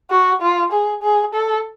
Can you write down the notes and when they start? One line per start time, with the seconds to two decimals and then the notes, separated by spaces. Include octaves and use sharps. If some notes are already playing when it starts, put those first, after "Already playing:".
0.11 F#4
0.42 F4
0.72 G#4
1.03 G#4
1.34 A4